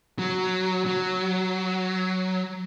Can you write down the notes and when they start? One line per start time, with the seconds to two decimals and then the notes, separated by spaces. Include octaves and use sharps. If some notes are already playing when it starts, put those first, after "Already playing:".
0.19 F#3
0.87 F#3